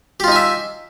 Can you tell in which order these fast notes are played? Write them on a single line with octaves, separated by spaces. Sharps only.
G4 F4 D#4 G#5 E5